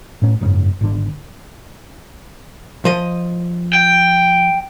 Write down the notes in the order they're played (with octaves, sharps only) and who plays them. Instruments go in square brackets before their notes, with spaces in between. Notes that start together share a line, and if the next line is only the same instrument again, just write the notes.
[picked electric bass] A2 C#4
F#1 G#2 C#3
G#1 D3
[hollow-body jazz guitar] F3 D#5
[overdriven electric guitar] G5